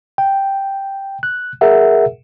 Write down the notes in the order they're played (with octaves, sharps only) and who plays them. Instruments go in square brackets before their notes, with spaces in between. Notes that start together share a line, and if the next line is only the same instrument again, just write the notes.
[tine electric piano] G5
F#6
G#4 A#4 E5 F#5